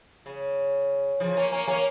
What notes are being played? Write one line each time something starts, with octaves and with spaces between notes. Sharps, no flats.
C#3
C#3 F3
A#3 C#4
A#3 C#4
A#3 C#4